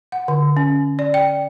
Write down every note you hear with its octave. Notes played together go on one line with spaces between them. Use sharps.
F#5
D3
C#4
D5
G5